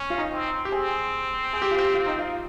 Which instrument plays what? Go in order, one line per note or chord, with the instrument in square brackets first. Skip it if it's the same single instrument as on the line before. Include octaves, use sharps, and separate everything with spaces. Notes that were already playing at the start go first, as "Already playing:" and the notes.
Already playing: [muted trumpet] C#4
[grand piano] F4
D#4
[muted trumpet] C4
[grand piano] G4
[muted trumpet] C4 [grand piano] G#4
[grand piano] G#4
G4
F4
G4
F4
D#4
F4